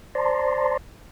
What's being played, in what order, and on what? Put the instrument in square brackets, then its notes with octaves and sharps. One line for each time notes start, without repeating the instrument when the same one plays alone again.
[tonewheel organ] C5 D5 A5 A#5 C6